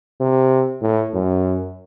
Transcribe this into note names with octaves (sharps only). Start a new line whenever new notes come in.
C3
A2
F#2